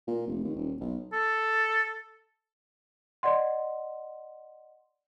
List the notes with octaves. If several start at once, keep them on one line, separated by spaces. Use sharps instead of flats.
A#2
F1
D#2
D#1
B1
A4
D5 D#5 F#5 C6